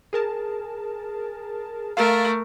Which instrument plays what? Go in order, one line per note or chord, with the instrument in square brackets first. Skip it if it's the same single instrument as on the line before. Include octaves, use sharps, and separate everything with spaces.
[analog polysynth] G#4 A#4 A5
[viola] A3 A#4 [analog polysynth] F5 A6